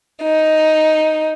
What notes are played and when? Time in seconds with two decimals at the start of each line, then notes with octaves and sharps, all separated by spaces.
0.22 D#4